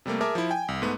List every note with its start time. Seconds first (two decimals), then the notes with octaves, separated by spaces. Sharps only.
0.06 C3 G3 A3 A#3
0.21 G#4 A#4 E5 A5 D6
0.35 F3 E4
0.50 G5 G#5
0.68 C2
0.82 G#2 A3 B3